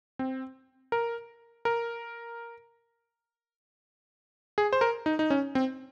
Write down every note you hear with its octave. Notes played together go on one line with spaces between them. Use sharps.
C4
A#4
A#4
G#4
C5
A#4
D#4
D#4
C#4
C4